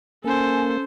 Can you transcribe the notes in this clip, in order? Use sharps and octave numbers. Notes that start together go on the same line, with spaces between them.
A#3 C#4 A4 C5 G#5